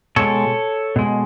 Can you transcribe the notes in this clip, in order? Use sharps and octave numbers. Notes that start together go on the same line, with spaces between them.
B2 G#3 A4 C#5
B2 G#3